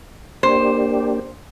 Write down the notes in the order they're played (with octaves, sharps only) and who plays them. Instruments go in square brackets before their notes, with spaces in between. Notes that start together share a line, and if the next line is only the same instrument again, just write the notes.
[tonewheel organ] A#3 D4 G4 [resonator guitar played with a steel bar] C5